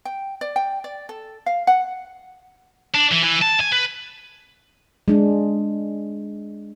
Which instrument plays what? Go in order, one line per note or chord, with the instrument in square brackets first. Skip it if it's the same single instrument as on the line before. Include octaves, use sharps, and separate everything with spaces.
[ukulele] G5
D5
G5
D5
A4
F5
F#5
[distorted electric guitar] D4
E3
E3
A5
G#5
B4
[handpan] G#3 D4